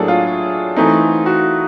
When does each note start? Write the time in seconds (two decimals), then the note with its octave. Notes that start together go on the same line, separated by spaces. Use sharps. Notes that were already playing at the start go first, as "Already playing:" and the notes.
Already playing: A2 F#3 A#3 D4 G#4 A4
0.08 F4
0.76 E3 A3 C4 D#4
1.26 F#4